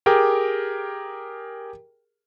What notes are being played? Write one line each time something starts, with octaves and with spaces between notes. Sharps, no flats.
G4 G#4 A#4 G5 D6